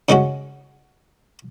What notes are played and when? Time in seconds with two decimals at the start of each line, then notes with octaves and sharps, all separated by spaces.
0.09 C#3 G#3 C#4 F#4